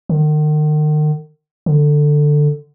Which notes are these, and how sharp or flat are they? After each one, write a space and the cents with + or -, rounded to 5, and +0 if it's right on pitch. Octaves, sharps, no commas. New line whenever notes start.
D#3 -40
D3 +10